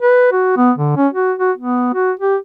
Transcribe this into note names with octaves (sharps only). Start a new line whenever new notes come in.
B4
F#4
B3
D3
C#4
F#4
F#4
B3
F#4
G4